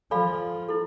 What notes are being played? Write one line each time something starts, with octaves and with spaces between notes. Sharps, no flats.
F3 A4 D5 F5 G#5 B5
E4 A4